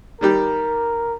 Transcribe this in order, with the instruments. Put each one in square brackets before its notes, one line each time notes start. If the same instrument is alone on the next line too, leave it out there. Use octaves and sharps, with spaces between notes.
[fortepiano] D#3 G3 G4 [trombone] A#4